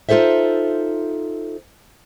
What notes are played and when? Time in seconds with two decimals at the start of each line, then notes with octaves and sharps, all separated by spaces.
0.09 D#4 F4 G#4 A4 C5 E5